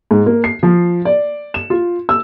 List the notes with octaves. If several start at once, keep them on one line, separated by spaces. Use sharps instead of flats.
G#2
A#3
C7
F3
D5
E7
F4
E6